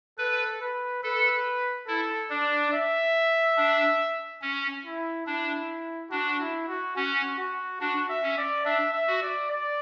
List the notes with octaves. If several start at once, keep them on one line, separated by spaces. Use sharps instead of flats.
A4 B4
B4
A4 B4
E4 A4
D4 D5
E5
D4
C#4
E4
D4 E4
D4 F#4
E4
F#4
C#4 F#4
F#4
D4 F#4
E5
C#4
D5
D4 E5
E5
F#4
D5
D5